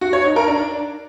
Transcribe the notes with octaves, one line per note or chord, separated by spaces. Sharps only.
F#4
C#5
D#4
A#4
D4